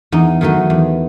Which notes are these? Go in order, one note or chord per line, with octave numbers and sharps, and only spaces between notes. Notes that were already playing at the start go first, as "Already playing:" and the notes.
E2 D#4
D#3 F#3 A3 D#4
E2